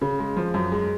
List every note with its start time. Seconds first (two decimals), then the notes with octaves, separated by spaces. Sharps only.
0.01 C#3
0.19 G#3
0.37 F3
0.54 F#2
0.72 G#3